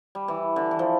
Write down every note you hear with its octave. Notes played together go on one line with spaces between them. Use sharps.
G3
E3
D3
E3
F3